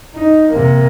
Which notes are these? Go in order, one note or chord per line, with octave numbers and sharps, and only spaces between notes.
D#4
C3 A#3